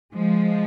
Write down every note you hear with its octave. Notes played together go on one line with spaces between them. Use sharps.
F3 G#3